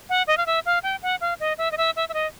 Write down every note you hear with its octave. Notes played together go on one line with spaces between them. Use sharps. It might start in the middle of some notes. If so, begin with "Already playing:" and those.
F#5
D#5
F5
E5
F5
G5
F#5
F5
D#5
E5
D#5
E5
E5
E5
D#5